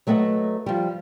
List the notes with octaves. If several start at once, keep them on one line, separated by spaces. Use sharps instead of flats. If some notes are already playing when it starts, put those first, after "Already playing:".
F#3 A3 B4 D#5 F#5
F3 G3